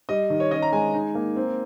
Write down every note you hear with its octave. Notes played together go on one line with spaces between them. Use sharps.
G3 D#5
D#3
C#5
C#4 D#5
A#5
G#3 G#5
D#4
A#3
C4